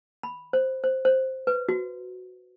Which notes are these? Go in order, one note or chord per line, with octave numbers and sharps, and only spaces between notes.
B5
C5
C5
C5
B4
F#4